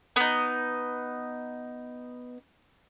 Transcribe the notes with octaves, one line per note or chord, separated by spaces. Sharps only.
B3 D#4